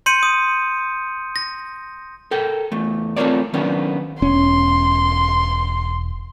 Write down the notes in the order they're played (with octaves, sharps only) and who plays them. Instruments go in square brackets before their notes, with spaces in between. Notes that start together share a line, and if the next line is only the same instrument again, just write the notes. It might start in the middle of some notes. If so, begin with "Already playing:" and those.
[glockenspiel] C6 G6 C#7 D#7
D#6
A#6
[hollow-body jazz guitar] A4 A#4 G5
E2 A3
A3 C4 F4 A#4 C#5 D5
D#3 F#3 A#3 B3 C#4 D4
[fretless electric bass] E1 C#4 [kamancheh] C6